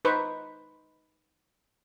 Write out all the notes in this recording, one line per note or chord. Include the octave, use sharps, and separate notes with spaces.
D#4 B4 C5 C#6